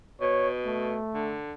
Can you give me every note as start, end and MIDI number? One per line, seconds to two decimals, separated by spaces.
0.21 0.97 47
0.21 0.49 73
0.66 1.38 57
1.14 1.54 50